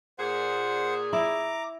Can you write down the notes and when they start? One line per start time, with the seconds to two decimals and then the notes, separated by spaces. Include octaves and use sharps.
0.18 A#2 G#4 C5 F#5
1.13 E4 A#5 D6